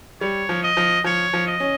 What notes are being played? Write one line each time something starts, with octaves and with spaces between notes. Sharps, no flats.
G3 C#5
F3
D#5
F3
F3 C#5
F3
D#5
C#4